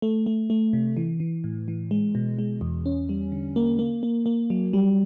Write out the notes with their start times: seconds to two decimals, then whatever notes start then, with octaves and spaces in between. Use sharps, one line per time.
0.02 A3
0.26 A3
0.50 A3
0.73 C3
0.97 E3
1.20 E3
1.44 A2
1.68 E3
1.91 G#3
2.15 B2
2.39 G#3
2.61 E2
2.86 C#4
3.09 G3
3.32 D3
3.56 A#3
3.79 A#3
4.03 A#3
4.26 A#3
4.50 F#3
4.73 G3